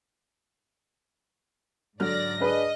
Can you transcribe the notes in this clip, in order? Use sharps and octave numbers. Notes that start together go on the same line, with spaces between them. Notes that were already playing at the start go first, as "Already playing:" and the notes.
G#2 D3 F#3 D5 F6 A#6
D4 G#4 B4 D#5